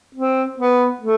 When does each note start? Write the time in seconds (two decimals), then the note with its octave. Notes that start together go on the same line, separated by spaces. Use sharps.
0.15 C4
0.58 B3
1.01 A3